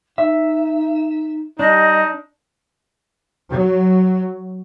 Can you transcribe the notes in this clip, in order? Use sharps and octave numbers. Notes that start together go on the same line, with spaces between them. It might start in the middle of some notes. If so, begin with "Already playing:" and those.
D#4 E5
G3 D4 D#4 D#5
F#3